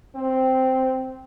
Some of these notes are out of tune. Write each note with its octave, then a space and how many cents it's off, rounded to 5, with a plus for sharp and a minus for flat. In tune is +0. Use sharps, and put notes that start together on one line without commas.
C4 -5